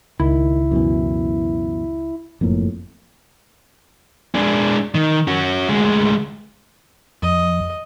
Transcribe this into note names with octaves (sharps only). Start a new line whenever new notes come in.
C#2 D#3 E4
F#2 B2 E3
F#1 F2 A2 A#3
G#3 D4
D#3
C#4 F#4
D2 G#3
F2 D#5